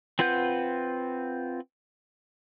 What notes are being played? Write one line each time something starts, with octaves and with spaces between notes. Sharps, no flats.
C4 F4 B4 F#5 G6